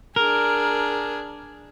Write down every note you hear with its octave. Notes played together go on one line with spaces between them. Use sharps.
D4 G#4 A#4